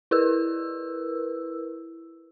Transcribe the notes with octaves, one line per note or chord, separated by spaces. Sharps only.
E4 A#4 B4 E6